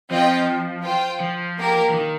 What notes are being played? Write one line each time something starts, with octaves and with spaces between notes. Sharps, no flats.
F3 C4 F4 D#5 G5
F4 C5 G5
F3
A#3 G4 A#4
F3
D#3